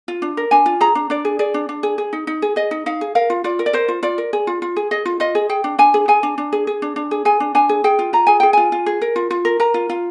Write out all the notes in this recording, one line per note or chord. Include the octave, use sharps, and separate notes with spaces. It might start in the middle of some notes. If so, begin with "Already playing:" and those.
F4
D4
A#4
D4 G#5
F4
G#4 A#5
D4
D4 D5
G#4
G#4 D5
D4
D4
G#4
G#4
D#4
D#4
G#4
G#4 D#5
D#4
D#4 F5
G#4
A#4 F5
F4
F4 D5
A#4
D5
A#4 C5
F4
F4 D5
A#4
G#4
F4
F4
G#4
G#4 D#5
F4
F4 D#5
G#4
G#4 G5
D4
D4 G#5
G#4
G#4 G#5
D4
D4
G#4
G#4
D4
D4
G#4
G#4 G#5
D4
D4 G#5
G#4
G#4 G5
F4
F4 A#5
G#4 G#5
G#4 G5
F4 G#5
F4
G#4
A#4
F4
F4
A#4
A#4 A#5
F4
F4